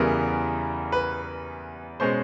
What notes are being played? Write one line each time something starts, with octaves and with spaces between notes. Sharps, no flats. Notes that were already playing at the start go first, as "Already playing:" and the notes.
Already playing: E2 C#3 E3 G3 B3 A#4
B4
B2 G#3 C#4 C5